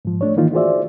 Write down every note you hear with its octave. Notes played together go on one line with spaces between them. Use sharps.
G#2 F3
A3 D4 C#5
D#3 E3 A#3 D#4 F4
F4 F#4 G#4 C5 D5 E5